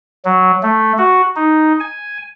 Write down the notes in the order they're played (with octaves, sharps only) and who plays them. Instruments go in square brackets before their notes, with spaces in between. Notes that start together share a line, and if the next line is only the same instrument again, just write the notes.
[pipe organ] F#3
A3
F#4
D#4
G#5